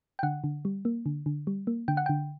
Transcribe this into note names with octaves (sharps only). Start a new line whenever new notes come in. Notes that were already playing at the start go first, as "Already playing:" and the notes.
G5
D3 F#5
D3
G3
A#3
D3
D3
G3
A#3
D3 G5
F#5
D3 G5